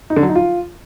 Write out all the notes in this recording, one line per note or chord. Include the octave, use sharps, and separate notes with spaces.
D#4
D3
F#3
D#4
F4